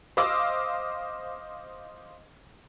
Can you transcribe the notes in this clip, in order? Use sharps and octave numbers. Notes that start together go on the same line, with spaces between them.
C5 D#5 F5 D6 E6